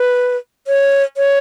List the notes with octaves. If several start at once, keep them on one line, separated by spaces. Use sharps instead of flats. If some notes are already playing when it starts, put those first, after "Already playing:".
Already playing: B4
C#5
C#5